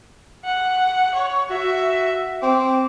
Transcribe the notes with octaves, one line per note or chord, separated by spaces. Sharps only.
F#5
C#5
F#4 E5
C4 D6